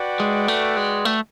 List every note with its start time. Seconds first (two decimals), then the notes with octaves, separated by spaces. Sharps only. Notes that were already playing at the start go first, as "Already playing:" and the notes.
Already playing: F#4 B4 D5 G5
0.20 G#3
0.48 A3
0.77 G#3
1.05 A3